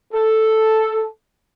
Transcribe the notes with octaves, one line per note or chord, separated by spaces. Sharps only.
A4